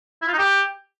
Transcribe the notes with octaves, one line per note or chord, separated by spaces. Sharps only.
E4
F4
D#4
G4